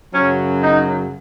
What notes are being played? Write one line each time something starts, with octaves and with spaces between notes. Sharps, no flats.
F#2 C#3 F#3 C#4
D#4